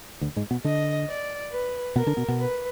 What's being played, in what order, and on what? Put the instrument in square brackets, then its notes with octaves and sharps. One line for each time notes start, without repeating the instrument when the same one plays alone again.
[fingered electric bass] D2 D3
G#2 G#3
B2 B3
[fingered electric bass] D3 D4 [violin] D#5
[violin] D5
B4
[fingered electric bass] B2 B3 [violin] A#4
[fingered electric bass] D3 D4
B2 B3
B2 B3
[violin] B4